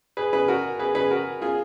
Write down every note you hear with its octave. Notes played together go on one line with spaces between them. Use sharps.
G#4 B4
G#4 B4
F#4 A#4
G#4 B4
G#4 B4
F#4 A#4
F4 G#4